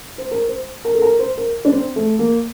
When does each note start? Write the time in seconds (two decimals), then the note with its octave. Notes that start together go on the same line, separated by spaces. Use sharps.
0.18 C5
0.31 A#4
0.48 C5
0.85 A#4
0.95 A4
1.02 A#4
1.19 C5
1.37 A#4
1.65 D4
1.72 C4
1.96 A3
2.19 A#3